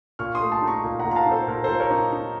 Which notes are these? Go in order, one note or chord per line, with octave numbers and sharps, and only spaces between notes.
A#2 C#6 F6
C6 D#6
A3
A5 C6
D#4
A#5 C#6
A#2
F#5 A#5
A#2
A#5
F5 A5
D#4
A4 C5
A#2 A#4
A#2 A4 C5
A#4 C#5
D#4
D#4